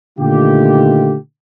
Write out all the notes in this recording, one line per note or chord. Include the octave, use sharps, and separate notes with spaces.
A#2 D3 D#3 A3 F4 G4